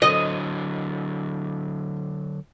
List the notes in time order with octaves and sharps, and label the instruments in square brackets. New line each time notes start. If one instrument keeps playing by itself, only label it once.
[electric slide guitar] D3 F#3 [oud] D#5